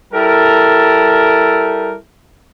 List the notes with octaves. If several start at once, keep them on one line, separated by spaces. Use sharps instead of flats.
G3 E4 A4 A#4